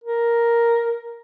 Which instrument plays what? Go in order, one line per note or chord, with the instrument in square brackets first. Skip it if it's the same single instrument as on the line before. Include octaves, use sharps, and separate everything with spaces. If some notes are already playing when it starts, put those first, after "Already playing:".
[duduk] A#4